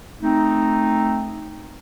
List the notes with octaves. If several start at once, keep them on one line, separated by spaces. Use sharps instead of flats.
A3 C4 D#4